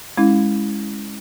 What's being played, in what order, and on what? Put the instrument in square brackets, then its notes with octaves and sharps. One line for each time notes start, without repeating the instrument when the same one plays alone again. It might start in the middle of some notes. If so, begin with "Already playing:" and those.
[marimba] G#3 C#4 E4